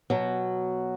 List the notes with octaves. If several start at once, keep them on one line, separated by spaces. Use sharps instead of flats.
B2 F#3